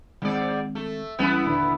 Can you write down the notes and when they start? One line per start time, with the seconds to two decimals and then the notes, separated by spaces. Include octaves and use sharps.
0.22 G#2 D#3 G#3 C4 D5
0.75 A3
1.19 C#2 E3 G3 B3 C#4 E4
1.46 D#2 A#2 D3